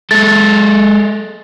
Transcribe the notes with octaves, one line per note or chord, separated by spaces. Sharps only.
G#3 A4 A6